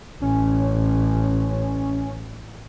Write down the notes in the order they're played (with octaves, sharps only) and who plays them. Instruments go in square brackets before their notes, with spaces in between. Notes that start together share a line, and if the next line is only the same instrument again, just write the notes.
[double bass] A1 [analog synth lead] C#4